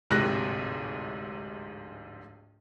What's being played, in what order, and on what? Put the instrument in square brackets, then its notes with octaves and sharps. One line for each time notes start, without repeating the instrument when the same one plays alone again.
[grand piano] D1 A#1 G#2 C3 F#6 A#6